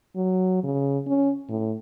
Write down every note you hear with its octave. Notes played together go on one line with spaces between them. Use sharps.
F#3
C#3
C#4
A2